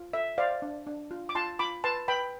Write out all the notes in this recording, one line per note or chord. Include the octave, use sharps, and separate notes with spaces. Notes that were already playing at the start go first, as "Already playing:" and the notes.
Already playing: F4
A4 E5
C5 D5 F5
D4
D4
F4
D6
F4 A5 C6
F4 B5 D6
B4 A5 C6
B4 G5 B5